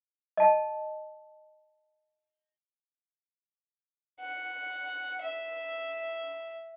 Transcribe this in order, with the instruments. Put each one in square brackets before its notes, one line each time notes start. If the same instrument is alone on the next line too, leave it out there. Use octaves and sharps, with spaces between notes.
[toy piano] D#5 A5
[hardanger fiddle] F#5
E5